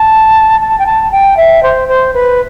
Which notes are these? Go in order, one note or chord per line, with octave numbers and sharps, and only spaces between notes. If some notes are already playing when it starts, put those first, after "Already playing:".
Already playing: A5
A5
G5
A5
G5
E5
C5
C5
B4